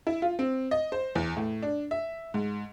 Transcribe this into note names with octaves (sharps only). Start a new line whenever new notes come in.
E4
F4
C4
D#5
C5
E2
A2
D4
E5
G#2